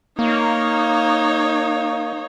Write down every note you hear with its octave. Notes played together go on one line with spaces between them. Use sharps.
A#3 D#4 C#5